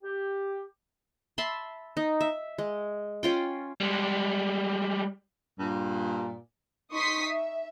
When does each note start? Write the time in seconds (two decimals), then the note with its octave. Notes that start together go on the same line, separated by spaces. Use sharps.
0.04 G4
1.38 E5 A5 B5 C6
1.97 D#4
2.21 E5
2.58 G#3
3.23 C#4 F4 G5
3.80 G3 G#3
5.59 G2 A#2
6.92 D#4 C6 C#6 D#6 B6 C7
7.24 E5